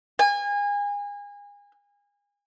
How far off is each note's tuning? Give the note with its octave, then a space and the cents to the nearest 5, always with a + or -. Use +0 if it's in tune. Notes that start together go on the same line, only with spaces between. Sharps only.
G#5 -30